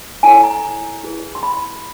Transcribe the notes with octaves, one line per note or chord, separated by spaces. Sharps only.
E4 A4 C#5 G#5
A#5
E4 G#4 B4
C6
B5